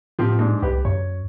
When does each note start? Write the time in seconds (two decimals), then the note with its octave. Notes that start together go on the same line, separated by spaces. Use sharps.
0.19 A2 F3 C4 G4
0.39 G#2 D4
0.62 C2 G4 B4
0.85 F#2 C#5